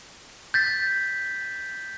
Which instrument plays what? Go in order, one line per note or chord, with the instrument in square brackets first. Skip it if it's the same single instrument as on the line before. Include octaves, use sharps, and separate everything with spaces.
[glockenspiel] G6 A6 B6